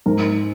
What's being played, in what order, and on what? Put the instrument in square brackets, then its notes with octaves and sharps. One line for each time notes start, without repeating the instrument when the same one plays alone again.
[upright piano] G#2 A#4